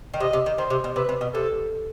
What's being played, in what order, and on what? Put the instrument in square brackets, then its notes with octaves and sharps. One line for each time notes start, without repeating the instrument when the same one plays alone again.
[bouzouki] D#3
[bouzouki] C3 [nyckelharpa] D#5
[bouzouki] C3
D#3
[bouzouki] D#3 [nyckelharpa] C5
[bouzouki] C3
B2
[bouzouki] C3 [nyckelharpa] B4
[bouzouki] C3
B2
[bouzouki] C3 [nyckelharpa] A4